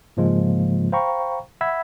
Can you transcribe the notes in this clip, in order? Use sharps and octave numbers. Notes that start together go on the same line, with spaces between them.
G#2 C#3 F3 G#3 A#3 F4
C5 F5 G5 A#5 B5 C#6
E5 F#5 B5 E6 G#6 B6